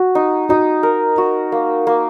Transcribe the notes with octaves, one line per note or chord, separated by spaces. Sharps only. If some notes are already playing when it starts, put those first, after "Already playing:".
Already playing: F#4
D#4
D#4 F#4
A#4
F#4
A#3
A#3